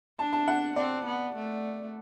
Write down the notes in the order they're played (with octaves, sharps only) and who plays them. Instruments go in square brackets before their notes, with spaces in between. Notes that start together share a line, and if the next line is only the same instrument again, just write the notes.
[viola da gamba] D4 [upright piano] A5
[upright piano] A5
F#5
[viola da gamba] C4 [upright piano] D5
[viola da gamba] B3
A3